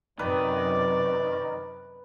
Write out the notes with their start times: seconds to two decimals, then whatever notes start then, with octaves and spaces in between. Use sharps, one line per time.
0.19 F#2 C3 D#3 B4 D5